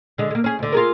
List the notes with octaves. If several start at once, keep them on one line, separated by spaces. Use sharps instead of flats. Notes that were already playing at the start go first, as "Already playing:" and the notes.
D3 G#3
G#3 A#3
C#4 G#4
D2 D3
F4 G#4 A#4